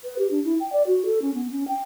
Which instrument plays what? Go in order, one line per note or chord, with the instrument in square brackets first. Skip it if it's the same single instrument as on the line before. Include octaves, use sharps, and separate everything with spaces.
[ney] B4
G4
D4
E4
G5
D5
F#4
A4
C#4
B3
C#4
G5